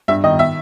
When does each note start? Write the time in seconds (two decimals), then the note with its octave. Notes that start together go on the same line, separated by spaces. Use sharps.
0.08 G2 E5
0.24 D#3 D#5
0.39 E5